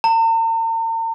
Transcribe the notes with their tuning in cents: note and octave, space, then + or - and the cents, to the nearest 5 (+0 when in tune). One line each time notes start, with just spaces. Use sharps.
A#5 -45